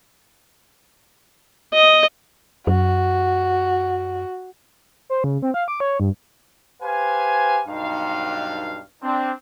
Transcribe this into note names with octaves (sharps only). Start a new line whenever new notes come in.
D#5
F#2 F#4
C5
C#3
C4
F5
D6
C#5
G2
G4 B4 C5 F5 G#5
B1 G2 D#4 F5
C4 D4